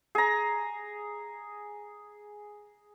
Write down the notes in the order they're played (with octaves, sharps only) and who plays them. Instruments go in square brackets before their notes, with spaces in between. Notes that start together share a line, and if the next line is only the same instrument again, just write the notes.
[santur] G#4 A#5